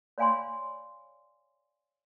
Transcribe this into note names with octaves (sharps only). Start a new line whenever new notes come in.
C#5 D5 F5 G#5 B5 C6